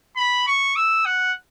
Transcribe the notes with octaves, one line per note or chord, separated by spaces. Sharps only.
B5
C#6
E6
F#5